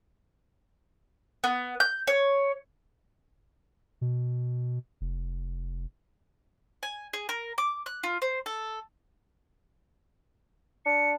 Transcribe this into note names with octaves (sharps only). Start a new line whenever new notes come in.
B3
G6
C#5
B2
F1
G#5
G#4
A#4
D6
F#6
F4
C5
A4
D4 C#7